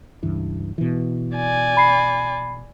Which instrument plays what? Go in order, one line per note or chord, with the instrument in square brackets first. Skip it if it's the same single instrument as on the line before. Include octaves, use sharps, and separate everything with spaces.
[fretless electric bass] C#2 G2 E3
B2 E3
[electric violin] D5 G#5
[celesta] B5 C7